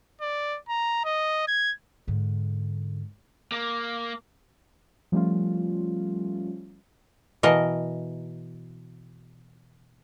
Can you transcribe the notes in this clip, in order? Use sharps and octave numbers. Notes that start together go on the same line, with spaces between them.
D5
A#5
D#5
G#6
G#2 D3
A#3
F3 G3 A3 C#4 F4
B2 E3 A#4 D#5